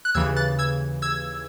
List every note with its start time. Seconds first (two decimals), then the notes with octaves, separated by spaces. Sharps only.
0.05 F#6
0.15 D#2 C#3 E3 E6 G#6
0.36 F#6 A6
0.59 E6 G#6
1.02 E6 G#6